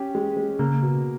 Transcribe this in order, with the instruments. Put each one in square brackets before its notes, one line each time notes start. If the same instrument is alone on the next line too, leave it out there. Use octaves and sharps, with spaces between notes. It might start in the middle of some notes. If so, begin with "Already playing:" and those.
Already playing: [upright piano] C#4 G4
G#3
G#3
[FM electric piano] C#3 [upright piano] A#3
[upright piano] B2